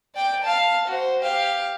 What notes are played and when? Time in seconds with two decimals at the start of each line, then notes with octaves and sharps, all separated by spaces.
0.15 D5 G5
0.43 F5 A5
0.87 F#4 C5
1.21 G4 F5